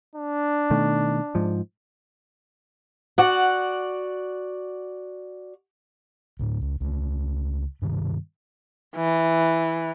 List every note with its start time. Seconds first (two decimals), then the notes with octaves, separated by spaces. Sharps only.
0.16 D4
0.71 B2 D#3 A3
1.35 G#2 F3
3.18 F#4 D5 F#5
6.39 D2 A2
6.61 C#2
6.81 C#2 A3
7.82 G2 C3 D#3 G3
8.96 E3